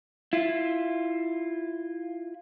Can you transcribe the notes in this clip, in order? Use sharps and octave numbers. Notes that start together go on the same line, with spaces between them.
E4 F4